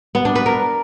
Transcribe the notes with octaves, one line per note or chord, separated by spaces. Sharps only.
B3
D4
B4
A#4